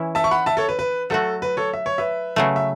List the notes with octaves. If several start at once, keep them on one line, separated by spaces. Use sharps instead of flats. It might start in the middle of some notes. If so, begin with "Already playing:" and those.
Already playing: E3 C#4 E4
E5 A5
C#6
F#5 B5
E5 A5
A4 C#5
B4
B4
F#3 A3 F#4 A4
B4
A4 C#5
E5
C#5
B4 E5
C#3 F#3 A3
E5